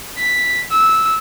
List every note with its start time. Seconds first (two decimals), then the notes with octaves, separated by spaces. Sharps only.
0.18 B6
0.71 E6